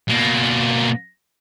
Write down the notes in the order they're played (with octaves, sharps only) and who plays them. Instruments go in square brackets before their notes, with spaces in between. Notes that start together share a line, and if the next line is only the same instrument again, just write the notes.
[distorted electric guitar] B2 A#3